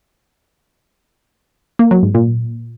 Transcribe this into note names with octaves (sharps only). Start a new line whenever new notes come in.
A#3
F#3
G#2
A#2